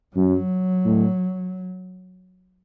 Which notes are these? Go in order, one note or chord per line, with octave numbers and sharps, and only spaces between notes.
F#2 F#3
A2